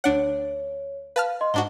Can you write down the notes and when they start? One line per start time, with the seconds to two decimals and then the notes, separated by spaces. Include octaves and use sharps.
0.04 D2 D4 C#5 F#5
1.16 B4 F5 A5 F6
1.41 D#5 C6
1.54 G#2 D4 F#4 G7